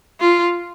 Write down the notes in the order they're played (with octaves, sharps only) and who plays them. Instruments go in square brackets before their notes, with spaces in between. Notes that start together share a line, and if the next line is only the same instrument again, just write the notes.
[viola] F4